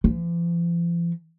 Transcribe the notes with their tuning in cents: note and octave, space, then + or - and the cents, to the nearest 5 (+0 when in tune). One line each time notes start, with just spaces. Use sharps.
F3 -45